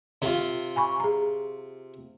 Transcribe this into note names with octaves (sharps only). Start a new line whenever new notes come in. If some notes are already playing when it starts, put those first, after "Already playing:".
C3 F4
G#5 B5 C#6
G#4 A#5